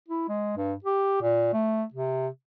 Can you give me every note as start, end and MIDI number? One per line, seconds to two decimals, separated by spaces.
0.08 0.26 64
0.29 0.54 56
0.57 0.74 43
0.84 1.18 67
1.22 1.50 46
1.53 1.84 57
1.94 2.28 48